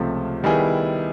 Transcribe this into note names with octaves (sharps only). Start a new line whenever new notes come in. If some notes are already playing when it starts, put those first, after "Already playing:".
Already playing: C#2 C3 F3 A3
D#3 G3 B3 E4 G#4